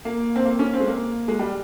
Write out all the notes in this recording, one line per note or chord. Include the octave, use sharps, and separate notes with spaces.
A#3
C4
A#3
C#4
C4
G#3
A#3
G#3
G3